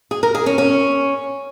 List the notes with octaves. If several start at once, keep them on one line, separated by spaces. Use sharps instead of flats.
G#4
A#4
G#4
C#4
C#4